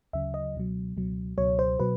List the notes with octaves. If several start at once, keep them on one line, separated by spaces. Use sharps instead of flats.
D2 C#3 F#3 E5
D#5
C#2 B2 F#3
C#2 B2 F#3
C#2 B2 F#3 C#5
C5
B2 F#3 B4